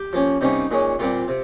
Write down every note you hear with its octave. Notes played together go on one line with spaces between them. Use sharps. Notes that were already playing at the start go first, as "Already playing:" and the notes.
Already playing: G4
F3 A#3 C#4
C3 G3 A#3 C#4 D#4
A#2 G#3 C#4
A#2 G3 C4 F4
C3